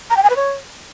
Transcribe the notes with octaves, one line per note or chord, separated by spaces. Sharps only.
A#5
G5
G#5
B4
C#5